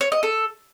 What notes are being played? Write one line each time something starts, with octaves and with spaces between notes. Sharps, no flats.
C#5
D#5
A4